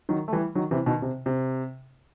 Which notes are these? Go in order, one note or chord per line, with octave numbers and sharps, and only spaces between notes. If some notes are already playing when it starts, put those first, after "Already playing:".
D#3 F#3
A3
E3 G3
D#3 F#3
C3 E3
B2 D#3
C3
C3